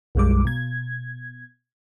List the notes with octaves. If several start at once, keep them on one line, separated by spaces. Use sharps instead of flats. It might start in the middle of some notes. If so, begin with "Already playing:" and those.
B1 F#2 G3 G#3 D6
B2 G#6